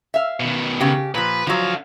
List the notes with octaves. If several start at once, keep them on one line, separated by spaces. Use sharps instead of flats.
E5 F5
B2 D#3
C#3 G4
A#2 F3 B4
D3 F3 F#3 F5